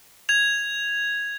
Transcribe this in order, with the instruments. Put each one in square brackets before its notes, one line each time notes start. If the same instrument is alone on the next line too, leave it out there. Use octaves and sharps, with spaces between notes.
[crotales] G#6 F7